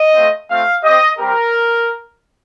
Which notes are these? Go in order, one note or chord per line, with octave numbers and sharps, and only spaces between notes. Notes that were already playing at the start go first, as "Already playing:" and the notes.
Already playing: D#5
A3 C4 F4
A3 C4 F4 F5
C4 G4 D#5
G3 C4 G4 A#4